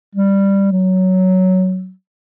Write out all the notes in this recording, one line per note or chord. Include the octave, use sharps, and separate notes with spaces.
G3
F#3